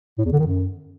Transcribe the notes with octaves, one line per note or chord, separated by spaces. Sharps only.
A2
E2
D3
D#3
F#2